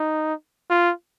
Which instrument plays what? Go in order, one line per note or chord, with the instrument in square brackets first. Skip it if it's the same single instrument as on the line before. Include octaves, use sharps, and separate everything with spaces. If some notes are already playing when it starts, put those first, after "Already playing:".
Already playing: [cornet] D#4
F4